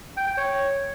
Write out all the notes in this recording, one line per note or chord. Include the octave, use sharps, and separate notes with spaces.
G5
G5
C#5